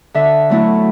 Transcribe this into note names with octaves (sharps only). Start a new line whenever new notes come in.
D3 E5
F#3 A3 E4